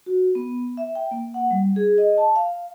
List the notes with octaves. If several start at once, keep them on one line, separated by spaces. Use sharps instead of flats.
F#4
B3
E5
G5
A#3
F#5
G3
G#4
D#5
A5
F5